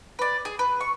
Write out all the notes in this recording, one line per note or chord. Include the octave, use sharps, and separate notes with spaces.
B4 D5
G#4
B4
C#6